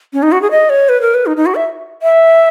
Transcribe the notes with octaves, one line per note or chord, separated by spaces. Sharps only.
C#4
D#4
F#4
G#4
D#5
C#5
B4
A#4
B4
D#4
D#4
F#4
E5
E5